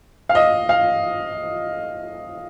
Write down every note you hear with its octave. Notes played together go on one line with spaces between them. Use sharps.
F5
D#5
F5